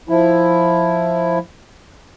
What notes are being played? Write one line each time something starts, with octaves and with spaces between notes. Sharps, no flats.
F3 E4